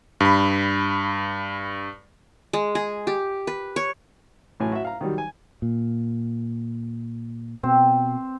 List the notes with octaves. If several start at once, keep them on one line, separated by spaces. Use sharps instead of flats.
G2 B5
G#3
G#4
G4
B4
C#5
A1 A2 F#3 G#5
F#4 E5
F5 A#5
D#3 F#3 G3
G#5
A#2
B2 C4